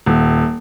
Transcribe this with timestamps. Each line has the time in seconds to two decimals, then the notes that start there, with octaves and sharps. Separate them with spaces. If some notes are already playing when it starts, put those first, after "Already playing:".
0.06 D#1